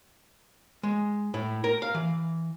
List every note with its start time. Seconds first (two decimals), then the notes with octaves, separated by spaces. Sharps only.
0.83 G#3
1.34 A2
1.64 A#4
1.82 F5
1.94 E3